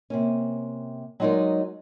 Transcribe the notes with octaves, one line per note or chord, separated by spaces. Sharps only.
C3 A#3 C#4
F#3 G#3 D#4 F4 A#4 D5